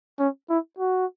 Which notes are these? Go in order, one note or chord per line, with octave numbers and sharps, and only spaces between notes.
C#4
E4
F#4